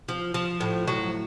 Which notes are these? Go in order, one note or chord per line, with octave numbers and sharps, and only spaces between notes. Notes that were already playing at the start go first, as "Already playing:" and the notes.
F3
F3
A2
F#3